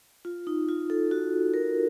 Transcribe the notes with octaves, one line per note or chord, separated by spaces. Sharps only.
F4
D#4
F4
A4
F#4
A#4